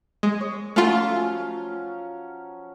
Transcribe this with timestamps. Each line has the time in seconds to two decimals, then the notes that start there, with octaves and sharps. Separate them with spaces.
0.23 G#3
0.41 C#5
0.76 F3 F#3 A3 C#4 F4